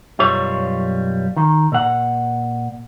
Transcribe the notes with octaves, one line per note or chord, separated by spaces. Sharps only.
B1 F#2 G3 F4 C#5
D#3
A#2 F#5